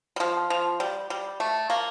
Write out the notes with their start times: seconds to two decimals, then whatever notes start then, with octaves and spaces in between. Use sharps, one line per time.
0.16 G3
0.20 F3
0.50 F3
0.80 G3
1.10 G3
1.40 A3
1.70 A#3